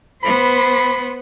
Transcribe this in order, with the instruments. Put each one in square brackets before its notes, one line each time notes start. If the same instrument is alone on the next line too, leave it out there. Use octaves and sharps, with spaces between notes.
[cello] B3 C5 [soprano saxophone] B5